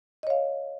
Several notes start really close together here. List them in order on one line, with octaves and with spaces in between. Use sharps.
D#5 C#5 F5